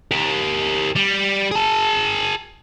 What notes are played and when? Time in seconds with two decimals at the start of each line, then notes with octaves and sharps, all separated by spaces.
0.11 G4 A#4
0.96 G3
1.51 G#4 A5